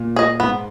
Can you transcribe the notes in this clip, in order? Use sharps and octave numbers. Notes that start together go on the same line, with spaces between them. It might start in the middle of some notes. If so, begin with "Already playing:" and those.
Already playing: A#2
G#4 D#5
G#2 B3